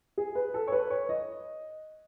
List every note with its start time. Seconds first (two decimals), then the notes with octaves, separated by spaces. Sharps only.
0.18 G#4
0.35 B4
0.54 A4
0.67 C#5
0.72 B4
0.90 C#5
1.09 D#5